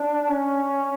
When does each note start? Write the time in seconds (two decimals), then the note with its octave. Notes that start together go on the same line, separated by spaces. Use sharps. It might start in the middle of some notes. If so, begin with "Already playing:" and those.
Already playing: D4
0.29 C#4